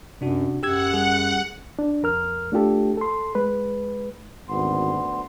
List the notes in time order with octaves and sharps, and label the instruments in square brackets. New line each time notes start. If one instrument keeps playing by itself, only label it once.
[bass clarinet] F#2 [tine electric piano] C3 D4 F#4
[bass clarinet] F#2 [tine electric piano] G4 E6 G#6 [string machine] F#5
[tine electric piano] G3 G#4
[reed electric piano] D4
F2 A#4 F6
A3 D4 F4 G4 A4
A4 C6
G#3 B4
[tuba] G#1 [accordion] D2 B3 C6